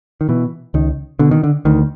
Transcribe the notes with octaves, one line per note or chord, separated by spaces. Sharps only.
D#3
B2 E3
C#2 D#3
B2 D3
D#3
D3
D2 D#3